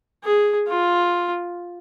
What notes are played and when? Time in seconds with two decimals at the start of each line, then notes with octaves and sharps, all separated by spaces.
0.24 G#4
0.68 F4